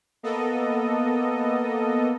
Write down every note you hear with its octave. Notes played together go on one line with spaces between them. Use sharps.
A#3 B3 A4 D#5